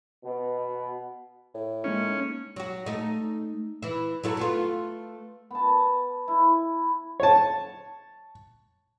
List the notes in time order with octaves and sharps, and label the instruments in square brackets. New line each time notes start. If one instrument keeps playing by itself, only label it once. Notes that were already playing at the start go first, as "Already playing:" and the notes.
[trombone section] B2
[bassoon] A2
[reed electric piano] G#3 A#3 D#4 [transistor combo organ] C#4
[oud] F#3 F#4
A3 D#4
E3 E4
F#3 E4 A4
A3 B3 F4
[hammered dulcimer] B3 A5
E4
[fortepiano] C#5 A5